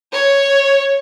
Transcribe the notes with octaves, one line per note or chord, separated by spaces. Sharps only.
C#5